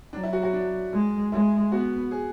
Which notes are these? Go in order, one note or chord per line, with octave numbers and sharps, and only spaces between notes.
F#3 D4
E4
F#4
F#4
D4
G#3
G#3 E4
B3 F#4
G#4